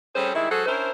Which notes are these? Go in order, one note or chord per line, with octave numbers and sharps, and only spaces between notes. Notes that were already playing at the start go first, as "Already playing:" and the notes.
G3 A3 C4 C#4 G#4 C5
D#3 G3 G#3 E4
F#3 G#3 G#4 A4 C5 F#5
C#4 D4 E4 A#4 C5